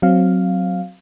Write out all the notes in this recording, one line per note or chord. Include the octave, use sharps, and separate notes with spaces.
F#3 C4 F5